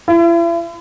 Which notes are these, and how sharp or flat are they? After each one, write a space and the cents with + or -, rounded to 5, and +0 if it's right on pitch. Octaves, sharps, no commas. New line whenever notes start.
E4 +40